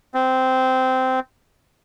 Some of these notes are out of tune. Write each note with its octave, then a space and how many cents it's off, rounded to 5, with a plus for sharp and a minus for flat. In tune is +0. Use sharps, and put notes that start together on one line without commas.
C4 -15